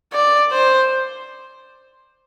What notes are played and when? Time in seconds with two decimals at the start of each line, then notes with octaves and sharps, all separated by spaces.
0.13 D5
0.51 C5